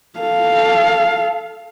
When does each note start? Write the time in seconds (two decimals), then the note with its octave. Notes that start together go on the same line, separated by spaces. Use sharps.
0.19 A4 F5